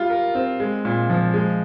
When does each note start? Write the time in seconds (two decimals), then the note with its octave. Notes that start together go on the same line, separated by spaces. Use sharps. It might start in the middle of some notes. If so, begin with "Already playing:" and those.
Already playing: G3 F4
0.10 A#4
0.35 C4
0.60 G#3
0.85 A#2
1.10 F3
1.34 G#3